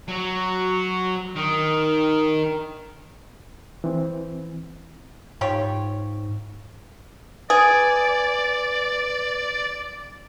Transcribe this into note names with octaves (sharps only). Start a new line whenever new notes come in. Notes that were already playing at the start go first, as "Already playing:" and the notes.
F#3
D#3
E3 C4
G#2 F4 G4 C#5
G#4 B4 D5